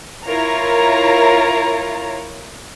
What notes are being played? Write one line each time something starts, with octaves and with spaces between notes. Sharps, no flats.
E4 F4 A#4 C#5 A#5